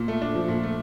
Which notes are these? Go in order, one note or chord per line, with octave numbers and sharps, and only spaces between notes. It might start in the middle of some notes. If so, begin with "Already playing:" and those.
Already playing: A#2
A3
D4
F3
A#2
A3